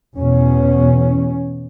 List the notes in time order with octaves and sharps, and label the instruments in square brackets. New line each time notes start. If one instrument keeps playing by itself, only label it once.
[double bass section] E2 B2 C#4